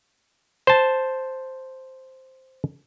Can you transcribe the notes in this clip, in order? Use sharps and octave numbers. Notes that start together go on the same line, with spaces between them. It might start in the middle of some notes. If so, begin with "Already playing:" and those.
C5 A5